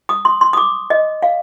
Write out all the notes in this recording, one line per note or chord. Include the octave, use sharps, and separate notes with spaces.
D#6
C6
C6
D#6
D6
D#5
F5